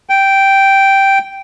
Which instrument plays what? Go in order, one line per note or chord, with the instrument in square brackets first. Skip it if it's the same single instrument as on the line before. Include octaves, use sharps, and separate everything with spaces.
[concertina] G5